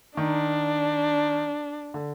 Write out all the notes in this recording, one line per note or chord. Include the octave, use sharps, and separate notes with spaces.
D#3 D4
D3